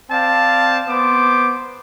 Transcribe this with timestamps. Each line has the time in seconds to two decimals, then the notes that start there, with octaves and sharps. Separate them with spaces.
0.11 C4 D5 F5 A5
0.89 B3 C5 D6